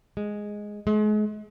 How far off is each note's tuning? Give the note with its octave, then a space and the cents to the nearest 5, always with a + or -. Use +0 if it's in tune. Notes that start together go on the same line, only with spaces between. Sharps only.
G#3 +0
G#3 +35